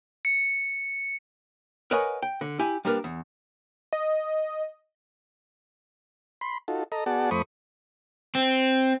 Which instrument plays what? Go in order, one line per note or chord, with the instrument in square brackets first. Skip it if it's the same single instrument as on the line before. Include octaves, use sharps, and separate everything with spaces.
[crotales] C#7
[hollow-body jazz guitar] A#4 B4 C#5 D#5 F#5 G#5
G5
D3
E4 G4 G#5
G3 A#3 D4 A#4 B4
E2
[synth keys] D#5
[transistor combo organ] B5 C6
D#4 F4 F#4 A4
A4 D#5 A#5
B3 F#4 G#4 D5 F#5 A5
F2 A3 C5 B5 C#6 D#6
[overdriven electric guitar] C4